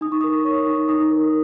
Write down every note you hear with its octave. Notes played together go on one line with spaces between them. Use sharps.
D#4 D#6
C#6
D#6
A#4
C#5 C#6
D#4
D#4 D#6
A#4